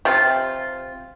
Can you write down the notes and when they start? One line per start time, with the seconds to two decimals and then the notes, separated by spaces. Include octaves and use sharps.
0.05 C3 F4